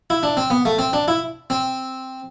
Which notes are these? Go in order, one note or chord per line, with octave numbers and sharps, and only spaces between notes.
E4
D4
C4
B3
A3
C4
D4
E4
C4